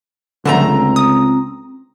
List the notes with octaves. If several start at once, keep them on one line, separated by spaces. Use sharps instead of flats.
C#2 D3 G3 A3 C4 A5 A#5
D#6